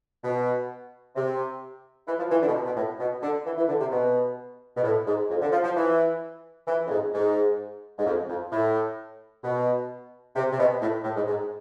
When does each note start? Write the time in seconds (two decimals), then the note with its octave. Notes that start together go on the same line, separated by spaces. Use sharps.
0.24 B2
1.16 C3
2.08 E3
2.19 F3
2.31 E3
2.42 D3
2.48 B2
2.54 C3
2.65 B2
2.77 A2
3.00 B2
3.23 D3
3.46 E3
3.58 E3
3.68 D3
3.80 C3
3.92 B2
4.77 B2
4.84 A2
5.07 G#2
5.30 F2
5.41 D3
5.52 F3
5.64 F3
5.76 E3
6.68 E3
6.87 F2
6.91 G#2
7.14 G#2
7.99 G#2
8.06 F2
8.29 F2
8.52 A2
9.44 B2
10.36 C3
10.52 C3
10.59 B2
10.82 A2
11.04 A2
11.16 G#2
11.27 G#2